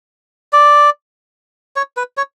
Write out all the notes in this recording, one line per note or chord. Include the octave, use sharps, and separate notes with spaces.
D5
C#5
B4
C#5